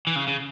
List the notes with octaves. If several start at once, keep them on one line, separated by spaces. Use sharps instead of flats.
E3
C#3
C#3